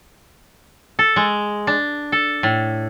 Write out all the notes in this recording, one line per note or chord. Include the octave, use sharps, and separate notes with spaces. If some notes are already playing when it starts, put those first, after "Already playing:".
A4
G#3
D4
A4
A2